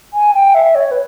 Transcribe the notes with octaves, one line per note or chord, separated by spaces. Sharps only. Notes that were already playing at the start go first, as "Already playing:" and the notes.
G#5
G5
E5
C#5
B4